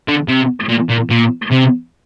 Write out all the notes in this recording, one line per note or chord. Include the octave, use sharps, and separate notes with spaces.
D3
C3
A#2
A#2
A#2
C3